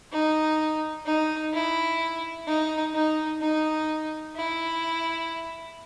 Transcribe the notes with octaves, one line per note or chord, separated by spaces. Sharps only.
D#4
D#4
E4
D#4
D#4
D#4
E4